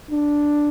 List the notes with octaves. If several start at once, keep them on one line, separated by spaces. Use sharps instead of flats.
D4